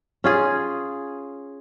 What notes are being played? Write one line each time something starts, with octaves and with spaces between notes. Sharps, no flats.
C#4 F4 G#4